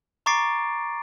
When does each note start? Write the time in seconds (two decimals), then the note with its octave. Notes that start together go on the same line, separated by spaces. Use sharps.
0.26 A#5 C#6 D6 A6 C7 D7